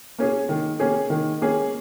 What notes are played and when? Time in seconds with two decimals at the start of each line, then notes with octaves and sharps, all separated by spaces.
0.19 A#3 C#4 G#4
0.49 D#3
0.80 A#3 C#4 G#4
1.10 D#3
1.42 A#3 C#4 G#4